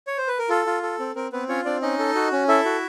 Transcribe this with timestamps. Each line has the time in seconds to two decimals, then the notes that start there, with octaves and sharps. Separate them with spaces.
0.07 C#5
0.18 C5
0.28 B4
0.39 A#4
0.49 F4 A4
0.67 F4
0.83 A4
0.99 C4
1.15 C4 A#4
1.32 B3 C4 B4
1.49 C#4 F4 C#5
1.65 C4 D4 D5
1.82 C#4 D#4 D#5
1.99 A4
2.15 F#4
2.32 C#4
2.48 E4 A4 E5
2.65 F#4